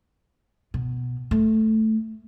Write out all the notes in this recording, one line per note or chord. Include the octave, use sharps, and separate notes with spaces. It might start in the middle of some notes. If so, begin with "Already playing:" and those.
B2
A3